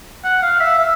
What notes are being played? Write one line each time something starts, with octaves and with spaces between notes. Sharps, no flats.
F#5
F5
E5
E5